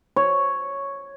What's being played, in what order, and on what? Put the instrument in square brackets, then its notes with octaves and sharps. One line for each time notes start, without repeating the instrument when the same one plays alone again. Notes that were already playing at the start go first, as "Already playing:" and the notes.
[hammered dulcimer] C#5